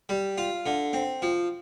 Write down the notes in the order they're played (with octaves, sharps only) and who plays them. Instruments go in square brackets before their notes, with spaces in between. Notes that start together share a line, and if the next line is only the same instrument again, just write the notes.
[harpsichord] G3
F4
D3
C4
F3